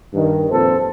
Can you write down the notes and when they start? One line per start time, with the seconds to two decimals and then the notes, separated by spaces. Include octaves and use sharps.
0.13 G2 D#3
0.51 F2 A#2 A4 B4 C5